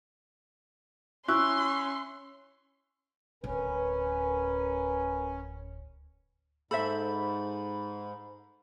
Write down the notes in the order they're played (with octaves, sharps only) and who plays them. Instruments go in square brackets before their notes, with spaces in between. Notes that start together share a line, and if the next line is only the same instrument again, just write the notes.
[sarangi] C#4 [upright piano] E4 F#6 [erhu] C6 [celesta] C#6 E6
[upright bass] D1 [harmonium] C#4 [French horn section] A#4 B4
[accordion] G#2 [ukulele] A4 C5 E5 [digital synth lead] B5